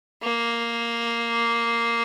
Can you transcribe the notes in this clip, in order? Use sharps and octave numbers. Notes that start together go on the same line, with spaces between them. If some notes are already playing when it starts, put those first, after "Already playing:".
A#3